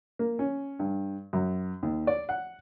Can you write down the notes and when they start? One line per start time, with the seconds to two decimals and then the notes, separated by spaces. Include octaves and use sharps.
0.19 A#3
0.39 C#4
0.79 G2
1.33 F#2
1.83 D#2
2.07 D5
2.29 F#5